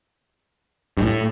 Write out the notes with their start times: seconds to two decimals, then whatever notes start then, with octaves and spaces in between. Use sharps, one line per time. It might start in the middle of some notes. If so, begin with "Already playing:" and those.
0.97 G2
1.02 A2